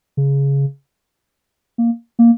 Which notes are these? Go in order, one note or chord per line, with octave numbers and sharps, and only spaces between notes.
C#3
A#3
A#3